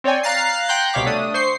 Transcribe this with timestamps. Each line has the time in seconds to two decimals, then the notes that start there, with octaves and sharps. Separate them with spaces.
0.04 C4 C#5 D5 G5 G#5
0.23 F5 A#5 F#6 A6 C7
0.68 F#5 G5 A#5 C6 F#6 G6
0.93 C2 B2 C#5 F5 D6 B6
1.06 A3 D4 D#6
1.34 C5 C#6 C7